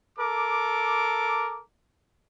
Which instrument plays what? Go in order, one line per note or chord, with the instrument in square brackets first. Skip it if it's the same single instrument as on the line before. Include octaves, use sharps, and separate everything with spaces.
[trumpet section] A4 A#4 D6